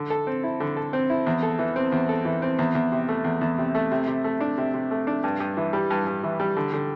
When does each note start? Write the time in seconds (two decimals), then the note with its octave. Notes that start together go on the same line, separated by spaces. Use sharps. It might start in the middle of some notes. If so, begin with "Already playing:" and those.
Already playing: D3
0.10 A4
0.27 C4
0.43 E4
0.60 D3
0.76 A4
0.93 C4
1.10 E4
1.27 E2
1.43 A4
1.59 E3
1.76 C4
1.92 E2
2.09 A4
2.25 E3
2.42 C4
2.59 E2
2.75 E2
2.92 C3
3.09 A3
3.24 E2
3.41 E2
3.58 C3
3.75 A3
3.91 C3
4.08 C3
4.24 A3
4.41 D4
4.58 C3
4.74 C3
4.91 A3
5.07 D4
5.24 G2
5.40 G2
5.57 E3
5.73 G3
5.90 G2
6.07 G2
6.23 E3
6.40 G3
6.57 D3
6.73 D3